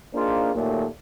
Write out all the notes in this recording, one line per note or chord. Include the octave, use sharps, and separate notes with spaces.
A#3 D4 D#4 F4 G#4 C5
D#2 A#2 D#3 F#3 A3